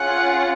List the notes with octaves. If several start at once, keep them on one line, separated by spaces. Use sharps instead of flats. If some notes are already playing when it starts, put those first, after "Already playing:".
Already playing: C#4 F4 G#4 F#5